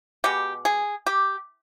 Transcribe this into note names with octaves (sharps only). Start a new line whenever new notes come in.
B2 G#3 B3 G4
G#4
G4